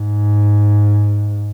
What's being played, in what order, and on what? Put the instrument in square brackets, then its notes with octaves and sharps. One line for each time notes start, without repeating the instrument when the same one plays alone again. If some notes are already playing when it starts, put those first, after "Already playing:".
Already playing: [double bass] G#2